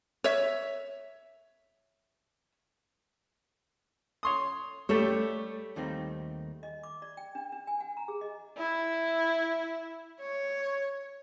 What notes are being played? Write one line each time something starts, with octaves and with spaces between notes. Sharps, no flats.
C#5 E5
C#5 C6 D#6
G3 A3 G4 A4 C#5
D#2 D#3 G3 A3 C4 D#4
D#5
D6
D5
G5
D4
D4
G#5
F#5
A#5
G#4
D#5
E4
C#5